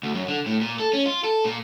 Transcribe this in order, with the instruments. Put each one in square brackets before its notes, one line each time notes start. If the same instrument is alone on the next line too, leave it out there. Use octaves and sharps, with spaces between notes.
[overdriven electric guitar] D2
F#2
D3
A2
A#2
A4
C#4
F4
A4
A#2